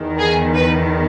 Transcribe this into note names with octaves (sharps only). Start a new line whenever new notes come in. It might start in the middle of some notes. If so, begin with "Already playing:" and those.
Already playing: E2 D#3
G#4
B4